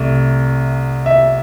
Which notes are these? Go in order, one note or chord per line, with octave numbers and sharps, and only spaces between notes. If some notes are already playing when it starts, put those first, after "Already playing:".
Already playing: C2 C3 A3
E5